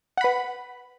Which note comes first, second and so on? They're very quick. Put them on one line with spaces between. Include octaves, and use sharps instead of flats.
F#5 B5 B4